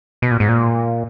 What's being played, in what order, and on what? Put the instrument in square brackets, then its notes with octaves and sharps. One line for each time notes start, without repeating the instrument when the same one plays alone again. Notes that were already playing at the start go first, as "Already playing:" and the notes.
[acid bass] B2
A#2
G#2
A#2